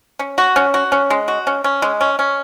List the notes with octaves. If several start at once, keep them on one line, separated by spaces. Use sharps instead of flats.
C#4
F#4
C#4
F#4
C#4
G#3
F#4
C#4
C#4
G#3
C#4
C#4